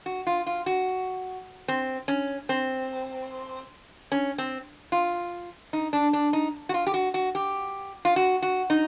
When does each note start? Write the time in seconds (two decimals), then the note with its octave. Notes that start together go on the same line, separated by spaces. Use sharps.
0.06 F#4
0.27 F4
0.47 F4
0.66 F#4
1.68 C4
2.08 C#4
2.49 C4
4.12 C#4
4.38 C4
4.92 F4
5.73 D#4
5.93 D4
6.13 D4
6.33 D#4
6.69 F#4
6.74 F4
6.87 G4
6.94 F#4
7.14 F#4
7.35 G4
8.05 F4
8.16 F#4
8.42 F#4
8.70 D#4